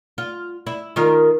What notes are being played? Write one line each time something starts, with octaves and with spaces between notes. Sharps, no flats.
F4
E4
D#3 F4 A#4